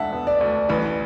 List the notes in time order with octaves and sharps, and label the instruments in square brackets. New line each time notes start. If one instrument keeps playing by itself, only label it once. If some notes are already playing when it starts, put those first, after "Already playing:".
Already playing: [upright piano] E1 D2 D3 [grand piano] E5 F#5 A5
[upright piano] B3
[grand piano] D5
[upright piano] D2
[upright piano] A1 [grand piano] B4